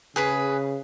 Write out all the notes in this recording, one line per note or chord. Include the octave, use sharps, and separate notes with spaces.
C#3 G#4 B4 B5